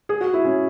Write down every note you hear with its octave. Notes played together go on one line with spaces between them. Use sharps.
G#4
F#4
E4
C#4